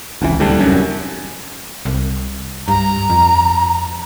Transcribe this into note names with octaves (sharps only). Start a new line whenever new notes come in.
F1 C#2 E3
D#1 D2 G3 D4
F1 F#2 C#4
C2
G2 A#5
F2